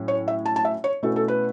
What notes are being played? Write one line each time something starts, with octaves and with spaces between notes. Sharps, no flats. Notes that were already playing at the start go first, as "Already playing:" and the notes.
Already playing: A2 F#3 C#4
C#5
E5
A5
A5
E5
C#5
B2 A3 C#4 E4 A4
A4
B4